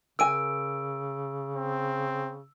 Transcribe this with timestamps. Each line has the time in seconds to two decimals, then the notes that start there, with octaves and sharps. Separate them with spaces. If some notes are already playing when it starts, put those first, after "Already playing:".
0.19 C#3 A#4 G#5 E6 D7
1.56 C4